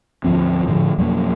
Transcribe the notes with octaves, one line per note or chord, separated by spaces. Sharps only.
D2 G#2 F3 C4
A2 D3 D#3 F3
F2 B2 F#3 A#3